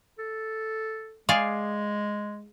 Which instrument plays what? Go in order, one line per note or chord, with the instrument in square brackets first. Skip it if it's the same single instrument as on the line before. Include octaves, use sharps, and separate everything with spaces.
[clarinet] A4
[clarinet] G#3 [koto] G#4 D5 F5